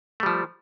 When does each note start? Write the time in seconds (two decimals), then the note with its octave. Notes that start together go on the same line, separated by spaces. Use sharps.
0.20 A3
0.23 G3
0.26 F3